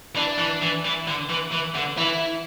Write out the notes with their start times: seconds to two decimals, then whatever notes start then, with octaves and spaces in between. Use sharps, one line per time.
0.15 E3 D4
0.39 E3
0.62 E3
0.85 E3
1.07 D3
1.29 E3
1.52 E3
1.75 D3
1.97 E3 E4